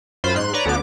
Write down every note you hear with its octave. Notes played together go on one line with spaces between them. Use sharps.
F#2 F4 C5 B5 F6
G#2 C6 F#6
B4 C#5 D5 A#5
D2 D3 B3 D6